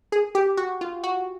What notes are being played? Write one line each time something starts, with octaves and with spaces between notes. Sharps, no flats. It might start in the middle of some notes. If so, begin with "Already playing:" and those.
G#4
G4
F#4
F4
F#4